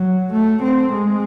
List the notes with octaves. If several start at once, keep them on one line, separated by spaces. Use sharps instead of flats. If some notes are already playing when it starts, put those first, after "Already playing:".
Already playing: F#3
A3
C4
G#3